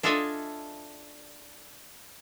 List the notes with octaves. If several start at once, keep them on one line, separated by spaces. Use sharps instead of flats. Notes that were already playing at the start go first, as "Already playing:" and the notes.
D4 F4 A4 D#5 E5 G#5